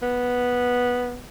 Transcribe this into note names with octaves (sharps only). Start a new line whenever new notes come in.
B3